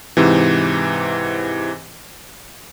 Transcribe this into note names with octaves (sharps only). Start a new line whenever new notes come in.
G#2 C3 E3